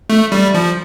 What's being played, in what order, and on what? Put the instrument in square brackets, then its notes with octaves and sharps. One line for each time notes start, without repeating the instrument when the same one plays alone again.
[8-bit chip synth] A3
G3
F3